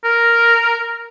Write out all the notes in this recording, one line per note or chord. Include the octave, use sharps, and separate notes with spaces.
A#4